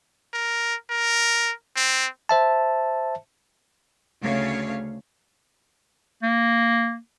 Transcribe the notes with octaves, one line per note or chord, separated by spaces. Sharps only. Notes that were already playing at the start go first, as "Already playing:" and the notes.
A#4
A#4
C4
C5 E5 A5
D2 C#3 A3 C#5 F5
A#3